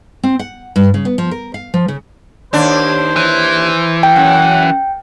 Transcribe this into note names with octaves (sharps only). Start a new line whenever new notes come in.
C4
F#5
G2
C#3
B3
F3
A#4
F5
F3
C#3
D#2 D4 C5
E3
G5
F#2 F#5